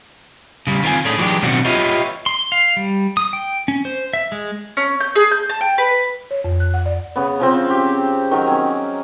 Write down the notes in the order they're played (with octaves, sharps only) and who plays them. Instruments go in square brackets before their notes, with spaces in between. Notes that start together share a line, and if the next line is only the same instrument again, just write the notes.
[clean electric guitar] C#3 G3
D#3 C4 F4 G#5
A2 A3 C#4 D4 G#4
E3 F#3 G#3 D4 G4
B2 D#3 F#3 C4 D4 F#4
F4 G4 B4 C#5 D#5 E5
[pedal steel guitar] C6
F5
G3
D#6
G5
C#4
C5
E5
G#3
[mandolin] C#4
G6
G#4
G6
A5
G5
B4
[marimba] C#5
F2
F#6
F#5
D5
[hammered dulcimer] C#3 B3
C#3 F3 C4
G4
D#3 F#3 A#4
C#4 G#5